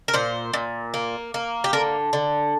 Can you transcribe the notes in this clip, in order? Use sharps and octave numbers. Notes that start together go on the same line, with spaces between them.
A#4
A#2 C5
A#2
A#3
A#3
G4
D3 A#4
D3